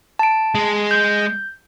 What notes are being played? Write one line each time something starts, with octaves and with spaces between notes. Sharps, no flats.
A5 D7
G#3
G6